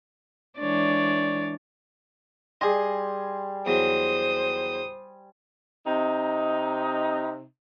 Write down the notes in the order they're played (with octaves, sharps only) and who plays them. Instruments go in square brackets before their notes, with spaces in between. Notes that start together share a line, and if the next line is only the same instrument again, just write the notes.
[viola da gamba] E3 G#3 D4 [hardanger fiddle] C#5 D5
[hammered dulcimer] G3 G#5 C6 [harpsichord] G#4 D#5
[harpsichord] E2 F#3 [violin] C5 D#6
[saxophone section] C3 D#4